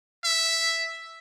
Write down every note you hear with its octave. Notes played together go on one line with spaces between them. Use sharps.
E5